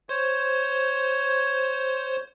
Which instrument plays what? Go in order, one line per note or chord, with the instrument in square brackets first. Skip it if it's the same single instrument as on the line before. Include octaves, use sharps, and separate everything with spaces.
[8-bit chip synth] C5 [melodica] C#5